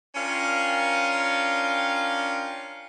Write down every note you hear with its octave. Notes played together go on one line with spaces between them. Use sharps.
C#4 D4 F4 A#4 G5